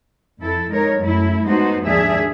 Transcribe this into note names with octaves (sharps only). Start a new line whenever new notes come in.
F2 E4 A4
G#3 D#4 A#4 C#5
F#2 A3 E4
G#3 A3 B3 D#4 F#4 C5
D#2 G#2 F3 D4 G#4 E5